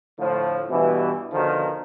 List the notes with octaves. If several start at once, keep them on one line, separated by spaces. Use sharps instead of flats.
A2 D3 F3
G2 B2 E3
B2 D3 D#3 F3